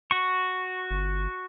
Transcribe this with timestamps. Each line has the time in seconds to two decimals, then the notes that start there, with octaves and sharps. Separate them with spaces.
0.11 F#4 C#6
0.91 G1